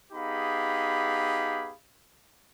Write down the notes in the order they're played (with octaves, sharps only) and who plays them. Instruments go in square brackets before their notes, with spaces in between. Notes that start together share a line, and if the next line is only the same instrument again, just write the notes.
[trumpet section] B3 D#4 G4 G#4 F5 B5